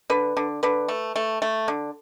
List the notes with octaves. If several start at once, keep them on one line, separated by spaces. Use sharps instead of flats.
D3 B4
D3
D3 B4
A3
A3
A3
D3